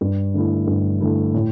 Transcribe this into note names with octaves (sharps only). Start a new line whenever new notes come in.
G2
D3 A3 E4
G2
D3 A3 E4
A2